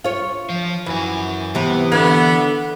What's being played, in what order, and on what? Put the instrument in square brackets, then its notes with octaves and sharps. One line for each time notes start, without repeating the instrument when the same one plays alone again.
[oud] F4 C#5
[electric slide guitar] F3
[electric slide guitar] F#2 F#4 [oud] E3
[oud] C3 B3 [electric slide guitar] E3
[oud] D3 [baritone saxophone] B3